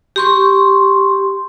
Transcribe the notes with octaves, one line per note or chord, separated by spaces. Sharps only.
G4 C6 C#6